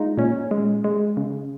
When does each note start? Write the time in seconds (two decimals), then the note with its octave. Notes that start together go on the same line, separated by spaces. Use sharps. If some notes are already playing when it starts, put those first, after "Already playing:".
Already playing: G#3 D#4 F4
0.18 A#2 C#4
0.51 G#3
0.84 G#3
1.17 C#3